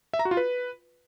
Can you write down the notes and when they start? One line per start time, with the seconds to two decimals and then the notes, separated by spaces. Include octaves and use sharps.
0.13 E5
0.19 A#5
0.25 F#4
0.31 F4
0.37 B4